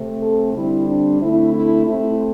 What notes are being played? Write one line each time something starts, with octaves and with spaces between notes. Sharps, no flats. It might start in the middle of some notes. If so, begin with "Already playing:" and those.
Already playing: C3 A3 C4
A4
D3 G3 C4 E4
D4
D3 A3 C4 E4
E4
C3 A3 C4 E4